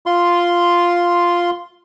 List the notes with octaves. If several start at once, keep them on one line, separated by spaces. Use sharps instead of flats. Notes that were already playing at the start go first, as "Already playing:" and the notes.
F4 C6